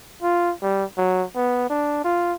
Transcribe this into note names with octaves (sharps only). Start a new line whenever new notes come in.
F4
G3
F#3
B3
D4
F4